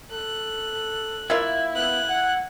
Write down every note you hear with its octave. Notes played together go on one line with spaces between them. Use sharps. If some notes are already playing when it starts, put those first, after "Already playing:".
A4 F#6
A#3 E4 F4 E5
B3 F#6
F#5